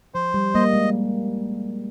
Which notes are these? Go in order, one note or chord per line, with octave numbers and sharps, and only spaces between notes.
F3 C5
G3
G3 A#3 D#5
G#3